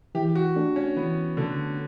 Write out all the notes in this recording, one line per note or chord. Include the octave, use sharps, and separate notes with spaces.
E3 G4
F#4
A3 D4 A4
C#4
E3 B3
D3 A3 D4 A4